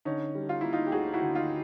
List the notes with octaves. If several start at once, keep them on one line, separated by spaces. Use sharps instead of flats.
D3 C#4 D#4
G3
F4
A#3 E4
D#4 F4
G4
D2 F#4 G#4
E4 F#4
D3
D#4 F4